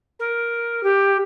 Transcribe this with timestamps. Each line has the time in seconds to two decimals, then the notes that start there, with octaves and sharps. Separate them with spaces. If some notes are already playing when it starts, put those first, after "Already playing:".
0.19 A#4
0.83 G4